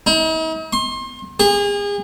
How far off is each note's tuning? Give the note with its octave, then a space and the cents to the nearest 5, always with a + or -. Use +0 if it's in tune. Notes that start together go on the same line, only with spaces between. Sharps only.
D#4 +45
C6 +30
G#4 -35